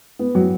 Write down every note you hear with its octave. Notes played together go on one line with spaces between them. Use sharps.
B3
F#3